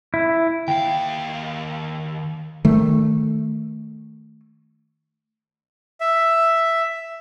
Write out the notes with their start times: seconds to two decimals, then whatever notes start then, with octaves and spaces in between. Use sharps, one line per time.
0.14 E4
0.68 D#2 F5 G5
2.65 D#3 A3
6.01 E5